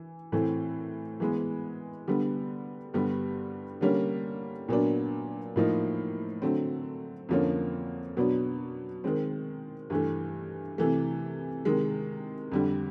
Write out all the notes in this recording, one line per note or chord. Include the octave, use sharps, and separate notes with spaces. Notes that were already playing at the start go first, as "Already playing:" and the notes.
Already playing: E3
A2 E3 A3 C4
E3 G#3 B3
D3 G3 B3
G2 D3 G3 B3
D3 G3 A#3 C#4
A#2 F#3 B3 D4
A2 F3 A#3 D#4
D3 F#3 A3 C4
F2 D3 F3 A#3 C#4
B2 F#3 B3 D4
D#3 G#3 C4
G2 E3 A3
C3 E3 A3
C3 D#3 G#3
F2 D3 G3